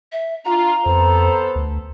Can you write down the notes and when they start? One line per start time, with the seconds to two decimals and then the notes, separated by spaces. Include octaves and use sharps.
0.12 E5
0.45 D4 F4 A#5
0.86 F2 B3 A4 C5
1.55 D2